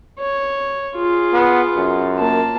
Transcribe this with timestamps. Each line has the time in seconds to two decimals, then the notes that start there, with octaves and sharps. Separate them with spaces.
0.20 C#5
0.96 F4 G#4
1.33 B3
1.76 F#2
2.19 A#3 A5